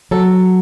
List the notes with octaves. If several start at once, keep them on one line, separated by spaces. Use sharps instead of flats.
F#3 A4